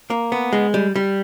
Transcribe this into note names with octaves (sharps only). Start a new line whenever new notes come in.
A#3
B3
G#3
G3
G3